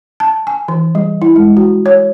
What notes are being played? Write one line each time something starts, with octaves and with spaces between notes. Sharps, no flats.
A5
G#5
E3
G3
E4
G#3
F#4
C#5